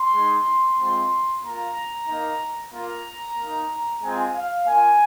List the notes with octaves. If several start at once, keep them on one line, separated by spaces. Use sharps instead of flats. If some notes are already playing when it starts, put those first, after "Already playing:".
Already playing: C6
G#3 D#4
G#3 C4 F4
A#3 F4 A#5
A#3 D#4
A#3 F4 A#5
A#3 D#4
G#3 C4 F4 G#5
F5
A#3 F4 G#5